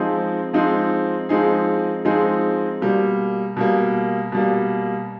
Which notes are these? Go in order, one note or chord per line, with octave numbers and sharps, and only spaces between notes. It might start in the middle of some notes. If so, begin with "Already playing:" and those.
Already playing: F3 G#3 C4 D#4 G#4
F3 G#3 C4 D#4 G#4
F3 G#3 C4 D#4 G#4
F3 G#3 C4 D#4 G#4
B2 G3 A#3
B2 G3 A#3
B2 G3 A#3